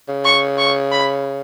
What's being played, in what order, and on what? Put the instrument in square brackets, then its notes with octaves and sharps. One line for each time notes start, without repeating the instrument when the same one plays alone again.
[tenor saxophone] C#3
[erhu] C#6
C#6
B5